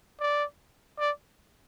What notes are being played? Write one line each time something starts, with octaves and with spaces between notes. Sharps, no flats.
D5
D5